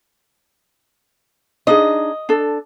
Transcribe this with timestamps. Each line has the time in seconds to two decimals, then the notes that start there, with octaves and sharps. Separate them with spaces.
1.67 D4 D#4 G#4 D#5
2.29 D4 A4